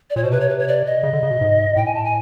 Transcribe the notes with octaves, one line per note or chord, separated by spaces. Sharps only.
D5
A#2 C#5
B2 C5
C3 B4
C#5
B4
C#5
D5
D#5
C#3
D3
C#3
B2
G#2
A2 G5
G#5
A5
G#5